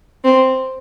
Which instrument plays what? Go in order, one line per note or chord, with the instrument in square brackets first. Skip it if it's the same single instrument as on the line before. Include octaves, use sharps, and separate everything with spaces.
[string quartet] C4